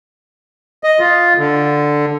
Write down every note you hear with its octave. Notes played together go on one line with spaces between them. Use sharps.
D#5
F4
D3